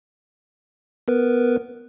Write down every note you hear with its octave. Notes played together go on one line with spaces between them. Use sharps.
B3 A#4 B4